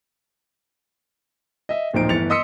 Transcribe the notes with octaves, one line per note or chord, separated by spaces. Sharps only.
D#5 E5
D1 A#2 F3 D#4 C5 D7
G1 E3 A6 C#7 F7
D#5 C6 D#6 E6 B6 C#7